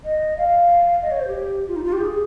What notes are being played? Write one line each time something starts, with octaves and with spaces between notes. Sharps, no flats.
D#5
F5
D#5
C#5
C5
G4
F4
D#4
F4
G4
G#4